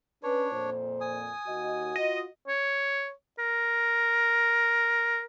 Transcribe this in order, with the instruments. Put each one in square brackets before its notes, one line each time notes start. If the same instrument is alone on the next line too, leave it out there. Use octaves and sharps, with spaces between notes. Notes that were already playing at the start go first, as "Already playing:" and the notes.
[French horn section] C#4 B4 [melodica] D4 C#5
[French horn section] F2 A#2 [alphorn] C5
[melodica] G#5 D#6
[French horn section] D#2 D#5 [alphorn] F#4
[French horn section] F4 [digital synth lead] D#5
[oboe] C#5
A#4